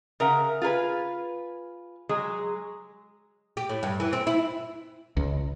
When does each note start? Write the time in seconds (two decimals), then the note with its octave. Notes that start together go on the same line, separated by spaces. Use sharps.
0.20 C#3 A#4 E5 F#5
0.62 F4 G#4 A#4 B4
2.09 F#3 G#3 G#4
3.57 G4
3.69 A2
3.83 G2
4.00 E3
4.13 C4
4.27 E4
5.17 C#2